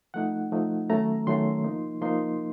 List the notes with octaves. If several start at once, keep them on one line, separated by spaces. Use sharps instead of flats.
F3 A3 D#4 F#5
F3 A3 D#4
D#3 F#3 A3 C#4 A#5
D#3 F#3 A3 C#4 C6
F3 A#3 D#4
F3 A#3 D#4 C6